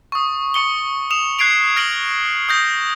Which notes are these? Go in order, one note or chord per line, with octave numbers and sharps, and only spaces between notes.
C#6 D#6
C#6 C#7 G7
D#6 E7 F7
F#6 G#6 C7 D7 F7
F6 A#6 D7 F#7
D#6 G6 A#6